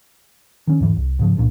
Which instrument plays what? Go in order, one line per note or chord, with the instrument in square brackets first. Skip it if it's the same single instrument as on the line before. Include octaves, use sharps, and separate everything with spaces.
[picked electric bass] D#3 C#4
E2 G#2 E3
C2
G#2 C#3 F3
C2 G2 A#2